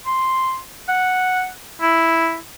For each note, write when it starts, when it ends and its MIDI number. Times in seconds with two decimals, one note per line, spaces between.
0.06 0.58 84
0.88 1.47 78
1.81 2.35 64